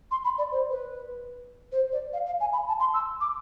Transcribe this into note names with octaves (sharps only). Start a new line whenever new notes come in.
C6
B5
D5
C5
B4
C5
D5
F5
F5
G#5
B5
A5
C6
E6
D6